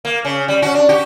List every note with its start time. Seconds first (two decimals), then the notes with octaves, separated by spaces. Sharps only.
0.05 A#3
0.25 C#3
0.48 G3
0.62 C#4 F#4
0.74 D4
0.89 F#4 G4